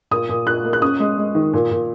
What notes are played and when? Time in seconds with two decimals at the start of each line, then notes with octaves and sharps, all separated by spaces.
0.11 A#2 D#6
0.29 A#2
0.46 A#2 F#6
0.65 A#3
0.73 F#6
0.82 C#4 D#6
1.00 G#3
1.18 G#3
1.35 D#3
1.53 A#2
1.71 A#2